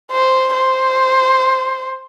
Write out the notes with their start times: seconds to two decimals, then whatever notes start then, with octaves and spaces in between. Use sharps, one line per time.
0.11 C5
0.54 C5